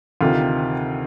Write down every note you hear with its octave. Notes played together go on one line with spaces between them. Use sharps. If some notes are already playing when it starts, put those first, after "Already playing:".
D2 C3 D#3 F4